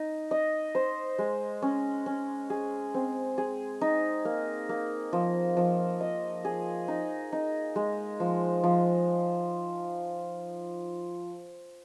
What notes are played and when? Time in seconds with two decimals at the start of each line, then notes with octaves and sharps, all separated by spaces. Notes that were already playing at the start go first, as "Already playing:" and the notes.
Already playing: D#4
0.31 D#5
0.75 C5
1.19 G#3
1.62 C#4
2.06 C#4
2.50 G#4
2.94 C4
3.38 G#4
3.81 D#4
4.25 A#3
4.69 A#3
5.13 F3
5.57 F3
6.01 D#5
6.45 G#4
6.88 D#4
7.33 D#4
7.76 G#3
8.20 F3
8.64 F3